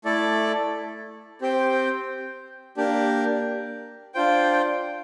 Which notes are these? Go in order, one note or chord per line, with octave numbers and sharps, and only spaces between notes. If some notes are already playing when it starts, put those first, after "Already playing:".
A3 E4 A4 D5
C4 G4 C5 G5
A#3 D4 G4
D4 F4 C5 G5